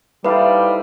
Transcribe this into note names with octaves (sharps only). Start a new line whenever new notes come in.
G3 D#4 E4 A4 B4 C5 D5 F5